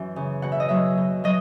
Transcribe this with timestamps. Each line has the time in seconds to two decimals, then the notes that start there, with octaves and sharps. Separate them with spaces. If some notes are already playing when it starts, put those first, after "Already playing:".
Already playing: F#2 E3 C#4
0.16 C#3
0.42 B2 F#5
0.52 E5
0.60 D#5
0.69 F#3 E5
0.98 B2
1.24 F#3 D#5